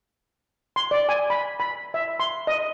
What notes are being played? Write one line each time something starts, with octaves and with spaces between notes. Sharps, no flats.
C6
D5
G#5
B5
B5
E5
C6
D#5